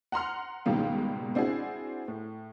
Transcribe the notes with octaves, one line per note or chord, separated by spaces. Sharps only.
F#5 A#5 C6 F6
C#2 G#2 B2 D#3 G3 A#3
C4 D4 E4 F#4 G#4
A2